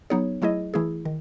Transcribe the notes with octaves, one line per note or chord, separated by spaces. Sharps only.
F#3 B3 D#4 G#4 C#5
F#3 A3 E4 G#4 D#5
E3 A3 E4 G#4
D#3